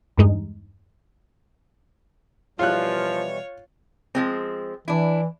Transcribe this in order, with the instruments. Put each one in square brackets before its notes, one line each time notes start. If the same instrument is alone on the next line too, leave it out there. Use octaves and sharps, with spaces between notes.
[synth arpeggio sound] E2 G2 G#3 D#4
[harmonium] B2 E3 G3 [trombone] F3 [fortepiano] F4 F#6 [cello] C#5
[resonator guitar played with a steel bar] F3 G#3 C4
[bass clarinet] E3 [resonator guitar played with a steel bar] D4 E4